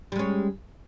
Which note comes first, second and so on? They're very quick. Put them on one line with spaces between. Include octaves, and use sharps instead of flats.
G3 G#3 C#4